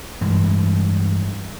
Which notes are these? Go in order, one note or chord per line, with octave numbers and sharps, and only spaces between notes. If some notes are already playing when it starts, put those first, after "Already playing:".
G2 E3 G#3